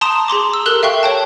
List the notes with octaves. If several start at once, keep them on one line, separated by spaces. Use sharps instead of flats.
A5 A#5 C6 D#6 E7
G#4 A#5 C6 D6
E6
G4 A4 A#4 F#6 G7
E5 F5 G5 C#6 F#6
C#5 G5 A5